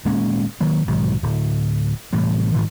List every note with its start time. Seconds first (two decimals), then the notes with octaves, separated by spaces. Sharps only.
0.05 D#1 G#3 A#3 C#4
0.61 D#3 F#3 A#3
0.88 B1 G#2 D#3 F#3
1.23 D1
2.13 A2 C3 E3 G3
2.54 G#2 D#3 F3 G3